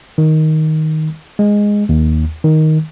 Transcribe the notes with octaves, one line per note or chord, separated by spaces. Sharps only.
D#3
G#3
D#2
D#3